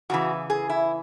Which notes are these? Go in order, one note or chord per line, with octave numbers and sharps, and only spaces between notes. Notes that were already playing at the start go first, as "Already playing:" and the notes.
E2 C#3 E3 F#4
G#4
E4